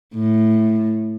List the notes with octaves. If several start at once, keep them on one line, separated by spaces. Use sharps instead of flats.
A2